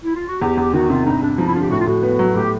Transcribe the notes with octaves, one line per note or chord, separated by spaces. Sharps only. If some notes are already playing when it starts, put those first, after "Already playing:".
E4
F4
F#4
E2 G4
E2 G4
D#3 F#4
C3 F4
G2 D#4
G2 D4
F3 D#4
E4
D3 F4
G4
A2 F#4
F4
A2 F#4
B3
F#3
A2 G4